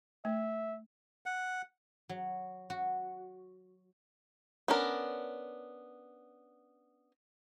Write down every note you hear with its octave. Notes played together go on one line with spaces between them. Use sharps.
A3 E5
F#5
F#3
F#4
B3 C#4 D4 A#4